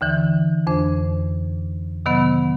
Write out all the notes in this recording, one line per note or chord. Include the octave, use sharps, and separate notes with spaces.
D#2 D3 E3
F2 D4 C5
C3 D#3 F#3 B3